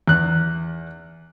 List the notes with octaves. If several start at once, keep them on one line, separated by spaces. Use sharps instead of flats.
E2 F#6